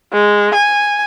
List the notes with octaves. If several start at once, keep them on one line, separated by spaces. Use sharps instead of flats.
G#3
G#5